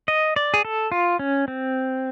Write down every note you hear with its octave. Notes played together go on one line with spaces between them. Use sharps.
D#5
D5
G#4
A4
F4
C#4
C4